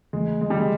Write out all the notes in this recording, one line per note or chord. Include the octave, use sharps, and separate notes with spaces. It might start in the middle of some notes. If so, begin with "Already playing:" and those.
E2 C#3 E3 G#3 A3
G#3
G3
G#3